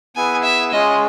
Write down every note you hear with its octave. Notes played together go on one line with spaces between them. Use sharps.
B3 E4 G#4 B4 G#5
E5
G#3 C#4 F4 G#4 D#5